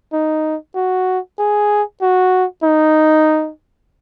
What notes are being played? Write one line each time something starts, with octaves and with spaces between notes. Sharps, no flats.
D#4
F#4
G#4
F#4
D#4